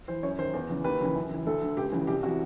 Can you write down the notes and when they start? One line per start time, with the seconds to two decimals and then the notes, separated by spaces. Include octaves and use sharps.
0.08 E3 C5
0.23 F#2 C#5
0.39 D#3 C5
0.53 E2
0.70 C#3 E3
0.84 D#2 B4
1.01 C#3 E3
1.16 F#2
1.31 C#3 E3
1.46 D2 A4
1.62 D3
1.77 C#2 G4
1.92 C#3 E3
2.07 C2 G4
2.23 C3 E3 F#4